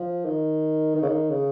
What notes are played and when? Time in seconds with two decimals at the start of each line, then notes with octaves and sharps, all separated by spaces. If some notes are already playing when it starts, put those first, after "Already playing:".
Already playing: F3
0.25 D#3
0.95 D#3
1.02 C#3
1.08 D#3
1.30 C#3